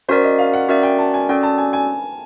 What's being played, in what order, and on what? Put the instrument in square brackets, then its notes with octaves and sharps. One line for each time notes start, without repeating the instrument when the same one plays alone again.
[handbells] C#4 F#4 A#4 D5 [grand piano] C5
[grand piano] D#5
F5
F#5
[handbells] C#4 F#4 A#4 D5 [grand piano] E5
[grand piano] G5
A5
G#5
[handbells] C#4 F#4 A4 D5 [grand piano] G5
[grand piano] A5
G#5
G#5